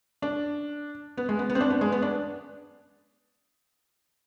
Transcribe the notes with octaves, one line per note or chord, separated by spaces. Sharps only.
D4
B3
G#3
B3
B3
C4
D4
B3
G#3
B3
D4